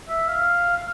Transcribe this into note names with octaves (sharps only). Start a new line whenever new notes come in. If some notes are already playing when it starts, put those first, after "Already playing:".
E5
F5
F5